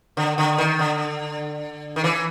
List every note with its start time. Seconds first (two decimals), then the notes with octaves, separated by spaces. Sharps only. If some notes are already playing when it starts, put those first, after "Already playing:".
0.17 D3
0.38 D3
0.58 D#3
0.79 D3
1.96 D#3
2.04 E3